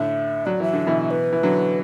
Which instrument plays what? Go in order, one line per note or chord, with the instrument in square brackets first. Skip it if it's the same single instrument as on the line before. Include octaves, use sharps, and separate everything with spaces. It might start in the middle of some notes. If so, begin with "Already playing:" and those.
Already playing: [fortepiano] A2 D3 [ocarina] E5
[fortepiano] F#3 [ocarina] D5
[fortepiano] E3 [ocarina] E5
[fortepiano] D3
B2 E3
[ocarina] B4
[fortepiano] E3
D3 F#3